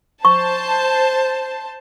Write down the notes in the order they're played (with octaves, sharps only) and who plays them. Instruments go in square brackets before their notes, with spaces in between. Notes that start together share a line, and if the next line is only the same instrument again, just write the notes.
[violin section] C5 A5 [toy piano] C#6